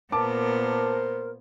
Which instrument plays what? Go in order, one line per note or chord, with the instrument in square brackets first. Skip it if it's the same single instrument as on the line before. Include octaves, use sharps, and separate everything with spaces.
[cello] A#2 B3 [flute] A#4 [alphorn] C5 [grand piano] A5 D6